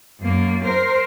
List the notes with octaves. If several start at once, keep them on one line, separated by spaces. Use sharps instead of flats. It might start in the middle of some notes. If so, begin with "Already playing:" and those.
F#2 A#3
A#4 C5